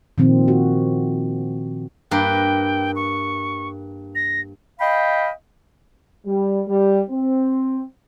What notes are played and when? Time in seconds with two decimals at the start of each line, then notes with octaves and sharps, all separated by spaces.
0.18 A#2 D#3 F3 C4
0.48 F#4
2.11 G2 A#3 B4 G5
2.96 C#6
4.15 A#6
4.80 D#5 F5 G5 B5
6.26 G3
6.67 G3
7.10 C4